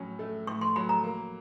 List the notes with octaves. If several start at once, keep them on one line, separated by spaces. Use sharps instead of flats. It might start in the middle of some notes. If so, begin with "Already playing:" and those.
Already playing: A2 F#3 C#4
A3
A2 C#6
C6
F#3 B5
A#5
A#3